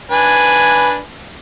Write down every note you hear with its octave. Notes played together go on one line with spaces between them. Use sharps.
D4 B4 G#5